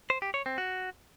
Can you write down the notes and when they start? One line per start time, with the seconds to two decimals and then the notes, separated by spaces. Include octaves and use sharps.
0.10 C5
0.22 G4
0.34 C#5
0.46 C4
0.58 F#4